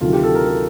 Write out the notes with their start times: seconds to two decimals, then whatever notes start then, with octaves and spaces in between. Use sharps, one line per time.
0.01 D2 C3 D#3 F#3 F4
0.13 G4
0.23 A4
0.35 A#4
0.47 A4